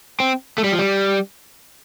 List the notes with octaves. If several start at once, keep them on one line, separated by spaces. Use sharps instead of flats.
C4
A3
G3
F3
G3